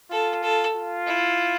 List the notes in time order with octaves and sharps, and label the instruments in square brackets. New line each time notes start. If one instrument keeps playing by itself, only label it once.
[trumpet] F4 [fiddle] A4
[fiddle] A4
[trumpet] F4
[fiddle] E4